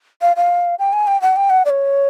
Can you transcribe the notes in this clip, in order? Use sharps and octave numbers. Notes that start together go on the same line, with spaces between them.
F5
F5
G5
G#5
G5
F#5
G5
F#5
D5
C#5